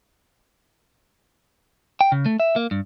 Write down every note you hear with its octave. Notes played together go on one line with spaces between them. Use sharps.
G5
C#3
A3
E5
A#3
G2